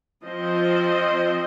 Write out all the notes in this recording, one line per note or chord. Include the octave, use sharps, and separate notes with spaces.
F3 C4 F4 C5 D#5